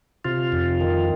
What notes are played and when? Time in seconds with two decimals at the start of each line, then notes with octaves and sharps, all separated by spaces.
0.25 C3 F4
0.52 F2
0.81 D#3